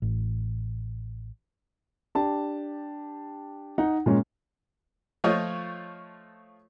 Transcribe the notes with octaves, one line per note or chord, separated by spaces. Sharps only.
A1
D4 G4 A5
D#4 F#5
A#2 G#3 C#4
F3 A3 F4 C#5 D#5